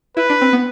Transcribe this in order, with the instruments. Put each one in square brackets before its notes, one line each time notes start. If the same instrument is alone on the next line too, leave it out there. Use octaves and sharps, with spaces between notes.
[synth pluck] E4 [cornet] B4
[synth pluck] D4
C4
B3